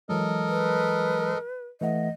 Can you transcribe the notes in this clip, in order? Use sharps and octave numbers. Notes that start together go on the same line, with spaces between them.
E3 F#3 G#3 A4 A#4 D#5
B4
E3 A3 D#5 F#5